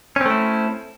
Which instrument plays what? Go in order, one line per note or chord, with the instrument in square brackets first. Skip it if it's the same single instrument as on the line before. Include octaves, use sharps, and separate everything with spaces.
[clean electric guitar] C#4
C4
A3
E4